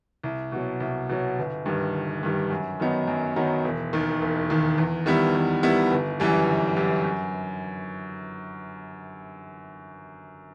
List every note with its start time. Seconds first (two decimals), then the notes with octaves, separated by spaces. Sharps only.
0.23 C2
0.52 B2 F#3
0.80 C2
1.09 B2 F#3
1.38 G1
1.66 G2 D#3 G3
1.94 G1
2.23 G2 D#3 G3
2.50 F#2
2.80 D#3 F#3 B3 D#4
3.07 F#2
3.36 D#3 F#3 B3 D#4
3.64 E1
3.93 D#2 D#3
4.22 E1
4.50 D#2 D#3
4.78 E2
5.06 D#3 G3 B3 E4
5.35 E2
5.63 D#3 G3 B3 E4
5.92 G1
6.20 F#2 E3 G3
6.48 G1
6.76 F#2 E3 G3
7.04 F#2